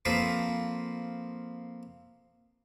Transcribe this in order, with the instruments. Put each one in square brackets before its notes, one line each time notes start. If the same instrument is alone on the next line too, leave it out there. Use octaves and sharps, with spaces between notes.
[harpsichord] F3 A#3 C4 A4 B4 C5